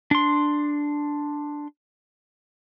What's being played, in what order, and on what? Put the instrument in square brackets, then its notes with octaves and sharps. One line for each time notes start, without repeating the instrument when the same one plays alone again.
[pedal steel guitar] D4 C6